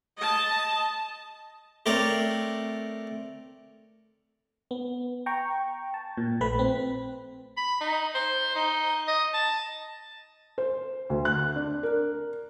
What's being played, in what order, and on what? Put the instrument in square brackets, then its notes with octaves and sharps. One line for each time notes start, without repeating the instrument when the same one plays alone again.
[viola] D#5 A5
[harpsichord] A3 C4 A#4 C#5 D5
[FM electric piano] B3
G5 A#5 C#6
A5
A#2
A#1 A3 B4 B5
C4
[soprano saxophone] B5
D#4
C5
D#4
D#5
A5
[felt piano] C5
D2
F#6
D4
A#4